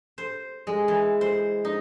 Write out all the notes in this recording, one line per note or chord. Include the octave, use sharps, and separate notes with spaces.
C5
G#3
E3
C5
D#4